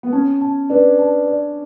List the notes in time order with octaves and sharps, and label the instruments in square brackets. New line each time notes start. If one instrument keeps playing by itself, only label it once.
[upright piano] B3
[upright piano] C#4 [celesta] A5
[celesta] A5
[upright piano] D4 [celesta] B4
[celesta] A5
D5